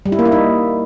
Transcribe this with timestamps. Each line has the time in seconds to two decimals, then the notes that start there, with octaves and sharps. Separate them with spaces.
0.06 G3
0.12 E4
0.19 A#3
0.25 E4
0.32 D#4